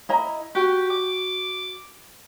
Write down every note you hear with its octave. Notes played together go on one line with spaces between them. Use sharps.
E4 D#5 A#5
F#4 G4
D6